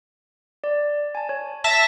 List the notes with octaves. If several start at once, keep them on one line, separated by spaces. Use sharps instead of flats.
D5
G#5 A5
C#5
E5 A5 A#6